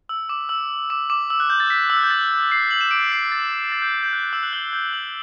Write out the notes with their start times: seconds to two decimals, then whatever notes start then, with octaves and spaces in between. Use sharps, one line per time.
0.09 E6
0.29 D6
0.49 E6
0.90 D6
1.10 D6
1.30 E6
1.40 F#6
1.50 G6
1.60 A6
1.70 B6
1.90 E6
1.96 F#6
2.03 G6
2.10 A6
2.52 C7
2.71 F#7
2.81 E7
2.91 D6 D7
3.12 C7
3.32 A6
3.72 A6
3.82 G6
3.93 A6
4.03 G6
4.13 F#6
4.23 F#6
4.33 E6 E7
4.43 F#6 F#7
4.53 G6 G7
4.73 G6 G7
4.93 F#6 F#7